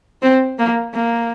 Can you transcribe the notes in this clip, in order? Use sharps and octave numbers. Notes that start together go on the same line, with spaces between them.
C4
A#3
A#3